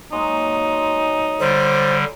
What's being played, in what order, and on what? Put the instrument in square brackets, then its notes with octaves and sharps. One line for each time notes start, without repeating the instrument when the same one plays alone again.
[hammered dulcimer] F#3 G#3 A#3 [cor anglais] D#4
[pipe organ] D3 G3 [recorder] C5